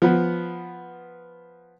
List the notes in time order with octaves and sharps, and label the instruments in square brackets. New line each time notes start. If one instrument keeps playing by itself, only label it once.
[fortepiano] F3 B3 B4